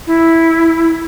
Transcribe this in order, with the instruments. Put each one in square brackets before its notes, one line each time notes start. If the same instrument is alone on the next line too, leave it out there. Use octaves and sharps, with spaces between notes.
[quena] E4